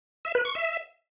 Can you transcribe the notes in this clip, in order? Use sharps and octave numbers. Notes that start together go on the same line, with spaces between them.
E5
B4
C#6
E5